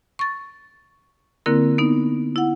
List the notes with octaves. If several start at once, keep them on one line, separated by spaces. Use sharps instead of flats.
C#6 A6
D3 A#3 C4 E4 A#4
B3 D#4
E4 F#5